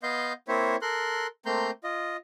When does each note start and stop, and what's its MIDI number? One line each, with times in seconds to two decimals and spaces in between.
0.03 0.33 59
0.03 0.33 75
0.03 0.33 77
0.03 0.33 84
0.03 0.33 91
0.48 0.76 58
0.48 0.76 60
0.48 0.76 64
0.48 0.76 72
0.48 0.76 73
0.48 0.76 76
0.82 1.27 69
0.82 1.27 70
0.82 1.27 84
0.82 1.27 90
1.46 1.71 57
1.46 1.71 58
1.46 1.71 60
1.46 1.71 82
1.46 1.71 84
1.46 1.71 91
1.84 2.17 65
1.84 2.17 75